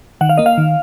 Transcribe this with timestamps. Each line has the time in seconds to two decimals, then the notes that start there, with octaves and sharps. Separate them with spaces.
0.21 D#3 F#5
0.29 F5
0.37 A#3 D#5
0.46 F5
0.58 D#3